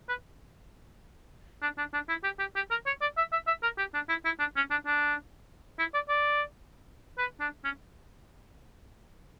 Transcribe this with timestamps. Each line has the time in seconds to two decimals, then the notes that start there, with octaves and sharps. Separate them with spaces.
0.09 B4
1.62 D4
1.78 D4
1.94 D4
2.09 E4
2.24 G4
2.39 G4
2.56 G4
2.71 A#4
2.86 C#5
3.01 D5
3.18 E5
3.32 E5
3.47 E5
3.63 A#4
3.78 G4
3.94 D4
4.09 E4
4.25 E4
4.40 D4
4.56 C#4
4.71 D4
4.86 D4
5.79 E4
5.94 D5
6.09 D5
7.18 B4
7.40 D4
7.64 C#4